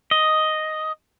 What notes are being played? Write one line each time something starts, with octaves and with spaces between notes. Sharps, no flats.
D#5